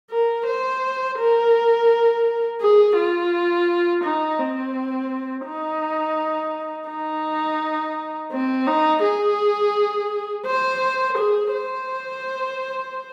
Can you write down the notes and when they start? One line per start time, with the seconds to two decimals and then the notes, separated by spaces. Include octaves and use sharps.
0.11 A#4
0.46 C5
1.18 A#4
2.61 G#4
2.96 F4
4.04 D#4
4.39 C4
5.46 D#4
6.89 D#4
8.32 C4
8.67 D#4
9.03 G#4
10.46 C5
11.17 G#4
11.53 C5